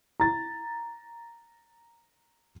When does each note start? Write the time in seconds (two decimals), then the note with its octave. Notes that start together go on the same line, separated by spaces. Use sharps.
0.20 A#5 A6